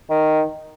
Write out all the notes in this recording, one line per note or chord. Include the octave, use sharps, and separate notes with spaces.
D#3